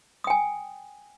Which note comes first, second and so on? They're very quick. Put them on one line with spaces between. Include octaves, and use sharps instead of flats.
D#6 G5 G#5